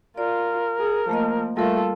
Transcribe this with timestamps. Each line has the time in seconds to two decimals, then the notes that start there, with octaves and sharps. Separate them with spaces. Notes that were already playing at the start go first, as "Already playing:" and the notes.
0.18 F4 A#4 D5
0.79 G#4
1.09 F3 A3 A#3 D#5
1.57 G3 A3 F4 A4 A#4